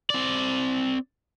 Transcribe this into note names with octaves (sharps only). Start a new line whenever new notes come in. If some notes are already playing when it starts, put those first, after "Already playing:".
C4 D5